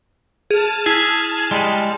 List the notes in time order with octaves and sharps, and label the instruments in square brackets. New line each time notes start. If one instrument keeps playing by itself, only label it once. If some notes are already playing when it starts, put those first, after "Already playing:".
[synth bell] G#4 [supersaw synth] A5 F6
[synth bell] E4 [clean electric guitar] G#4
[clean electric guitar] G3 G#3